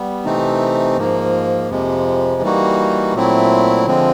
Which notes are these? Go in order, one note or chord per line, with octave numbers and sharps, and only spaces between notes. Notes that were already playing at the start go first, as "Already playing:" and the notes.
Already playing: G3 B3
C3 E3 A3 C4 D#4
G#2 F3 A#3
F2 C3 F3 G#3
E3 G3 A#3 D#4 F#4
A#2 F#3 A3 C4 E4
D3 F3 G#3 C4